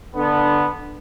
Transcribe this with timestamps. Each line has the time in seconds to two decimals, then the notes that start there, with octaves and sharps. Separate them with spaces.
0.16 D3 B3